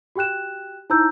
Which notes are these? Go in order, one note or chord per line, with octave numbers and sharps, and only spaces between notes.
F#4 G4 G5 F#6 E7
D#4 E4 C5 A#5 E6 G6